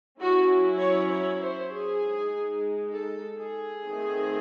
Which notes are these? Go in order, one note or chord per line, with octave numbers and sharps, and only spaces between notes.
F#3 C#4 E4 F#4
C#5
C#5
C5
G#4
G#3 D#4
A4
G#4
D#3 A3 C4